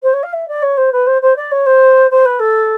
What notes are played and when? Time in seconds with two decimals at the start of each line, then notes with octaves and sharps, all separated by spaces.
0.03 C5
0.13 C#5
0.23 F5
0.33 E5
0.48 D5
0.62 C#5
0.77 C5
0.92 B4
1.06 C5
1.22 C5
1.36 D5
1.51 C#5
1.66 C5
2.11 C5
2.25 B4
2.39 A4